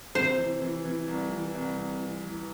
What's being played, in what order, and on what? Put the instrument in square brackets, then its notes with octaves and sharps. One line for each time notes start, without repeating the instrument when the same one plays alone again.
[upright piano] C3 [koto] C5
[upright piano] E3
E3
E3
C2
E3
C2
C2
E3
E3